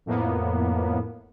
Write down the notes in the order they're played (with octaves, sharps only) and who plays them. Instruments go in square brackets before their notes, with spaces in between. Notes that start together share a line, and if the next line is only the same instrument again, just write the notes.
[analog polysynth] F2 A2 A#3 B3